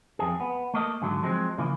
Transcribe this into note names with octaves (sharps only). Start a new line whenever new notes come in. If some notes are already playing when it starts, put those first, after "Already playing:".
F2 G#4
B3
A3 A#3 D#5
G#2 D3 F#3
F3 F#3 G#3 C4
C#3 E3 F3 A#3